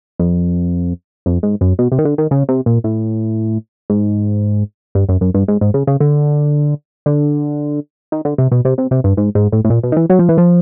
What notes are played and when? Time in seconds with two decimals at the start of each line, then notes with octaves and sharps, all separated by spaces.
0.19 F2
1.26 F2
1.43 G#2
1.61 F#2
1.79 B2
1.92 C3
1.98 D#3
2.05 D3
2.18 D#3
2.31 C#3
2.49 C3
2.66 A#2
2.84 A2
3.90 G#2
4.95 G2
5.09 F#2
5.21 F#2
5.34 G2
5.48 G#2
5.61 G#2
5.74 C#3
5.87 C#3
6.00 D3
7.06 D3
8.12 D#3
8.25 D3
8.38 C3
8.52 B2
8.65 C3
8.78 C3
8.91 C3
9.04 G2
9.17 G#2
9.35 G#2
9.52 A2
9.65 A2
9.70 A#2
9.83 B2
9.92 D#3
9.96 E3
10.10 F#3
10.19 F3
10.29 E3
10.38 F3